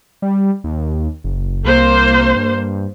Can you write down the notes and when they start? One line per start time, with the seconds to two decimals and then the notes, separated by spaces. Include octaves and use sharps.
0.22 G3
0.64 D#2
1.24 F#1
1.65 C2 A#3 C5
2.36 G2